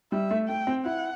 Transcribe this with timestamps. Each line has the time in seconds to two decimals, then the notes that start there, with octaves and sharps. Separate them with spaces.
0.12 G3 E5
0.31 A3
0.48 A3 G5
0.67 C4
0.85 E4 F#5